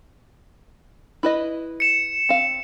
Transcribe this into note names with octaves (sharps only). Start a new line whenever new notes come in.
E4 B4 D#5
C#7 E7
C4 F5